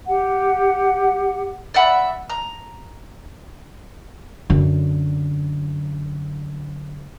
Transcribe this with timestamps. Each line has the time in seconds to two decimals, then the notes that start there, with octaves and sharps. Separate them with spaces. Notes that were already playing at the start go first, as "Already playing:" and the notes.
0.08 G4 F#5
1.74 D5 E5 F#5 B5
2.30 A#5
4.50 F#2 D3